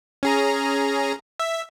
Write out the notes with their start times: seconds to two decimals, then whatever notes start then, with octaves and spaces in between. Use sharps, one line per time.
0.23 C#4 G#4 A#5
1.40 E5